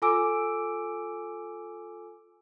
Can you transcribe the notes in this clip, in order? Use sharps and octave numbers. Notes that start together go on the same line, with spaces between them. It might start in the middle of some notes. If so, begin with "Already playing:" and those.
F4 A4 G#5 D6 E6 D7